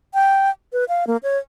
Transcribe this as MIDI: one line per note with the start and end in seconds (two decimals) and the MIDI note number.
0.14 0.50 79
0.73 0.85 71
0.89 1.07 77
1.07 1.17 58
1.23 1.38 73